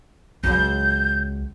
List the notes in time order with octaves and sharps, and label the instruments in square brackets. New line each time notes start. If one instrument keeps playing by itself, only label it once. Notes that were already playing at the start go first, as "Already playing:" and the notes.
[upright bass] C#2 F#3 [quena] G6